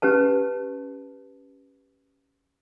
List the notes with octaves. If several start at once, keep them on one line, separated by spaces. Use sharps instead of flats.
C#4 G4 B4 A5